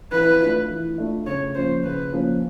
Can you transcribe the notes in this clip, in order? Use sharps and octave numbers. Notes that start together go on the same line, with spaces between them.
E3 B4
A3 D4 F4
E3
A3 D4 F4
C#3 C#5
F3 A#3 C#4 C5
C#3 B4
F3 A#3 C#4